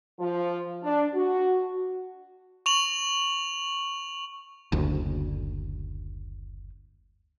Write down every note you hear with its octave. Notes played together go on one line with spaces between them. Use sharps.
F3
D4
F#4
C#6 F7 F#7
F#1 D2